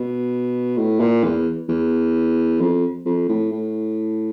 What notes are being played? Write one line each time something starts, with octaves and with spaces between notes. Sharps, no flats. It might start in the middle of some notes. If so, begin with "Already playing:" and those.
Already playing: B2
A2
A#2
E2
E2
F2
F2
A2
A2